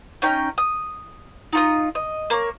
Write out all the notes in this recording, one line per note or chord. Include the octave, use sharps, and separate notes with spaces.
C#4 D#4 G5
D#6
D#4 F4 D#6
D#5
A#3 C#5